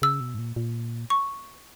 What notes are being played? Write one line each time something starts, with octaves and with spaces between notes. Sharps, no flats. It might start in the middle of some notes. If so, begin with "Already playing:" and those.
C#3 E6
B2
G#2
A#2
A#2
C#6